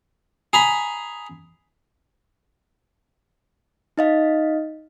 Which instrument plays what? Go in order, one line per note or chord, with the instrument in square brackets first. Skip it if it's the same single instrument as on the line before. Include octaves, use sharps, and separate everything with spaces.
[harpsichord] G#4 A#5 B5
[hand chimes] D#4 D#5 F5